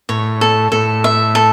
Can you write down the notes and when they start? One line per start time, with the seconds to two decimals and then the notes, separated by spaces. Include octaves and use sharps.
0.09 A2 C#5
0.41 A4
0.72 A2 A4
1.04 E5
1.35 A4